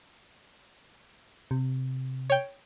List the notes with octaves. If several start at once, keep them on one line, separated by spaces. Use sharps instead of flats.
C3
C#5 G5